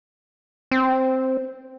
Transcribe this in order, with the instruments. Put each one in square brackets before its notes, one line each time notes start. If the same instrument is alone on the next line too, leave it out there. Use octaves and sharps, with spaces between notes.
[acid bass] C4